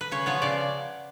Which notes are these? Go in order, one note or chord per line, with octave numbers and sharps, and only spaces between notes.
B4
C#3 C#5
F3 B3 C#5
C#3 D5